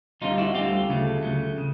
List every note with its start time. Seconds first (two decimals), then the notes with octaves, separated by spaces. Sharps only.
0.21 D2 D3 G3 C4 D#4 F4
0.38 E4 F#4
0.55 D2 D3 G3 C4 F4 G4
0.89 D2 C#3 F#3 A3
1.23 D2 C#3 F#3 A3
1.58 C#3